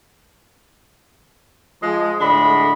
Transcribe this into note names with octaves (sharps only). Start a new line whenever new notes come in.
F3 G#3
A2 D3 G#3 D4 B5